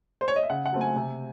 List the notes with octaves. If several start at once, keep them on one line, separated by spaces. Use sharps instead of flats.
C5
C#5
D#5
E5
C#3 F#5
F#5
F#3 A3 C4
G#5
C3